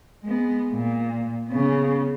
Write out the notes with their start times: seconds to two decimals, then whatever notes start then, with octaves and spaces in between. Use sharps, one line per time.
0.23 G#3 B3
0.73 A#2
1.49 C#3 B3